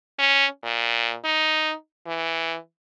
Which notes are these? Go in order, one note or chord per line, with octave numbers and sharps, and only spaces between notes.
C#4
A#2
D#4
E3